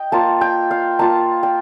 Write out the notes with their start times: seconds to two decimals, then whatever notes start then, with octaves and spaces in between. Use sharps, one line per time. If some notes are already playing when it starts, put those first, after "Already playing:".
Already playing: D#5 G5
0.12 A#3 F4 A5
0.41 G5
0.71 F5
0.99 A#3 F4 A5
1.43 G5